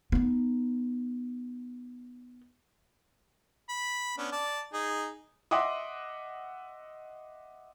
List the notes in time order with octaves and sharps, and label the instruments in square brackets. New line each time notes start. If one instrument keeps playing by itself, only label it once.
[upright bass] B3 D#4
[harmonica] B5
B3 C#4 D4
D5 A5
D#4 G#4
[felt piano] D#5 E5 F#5 C6 D6 D#6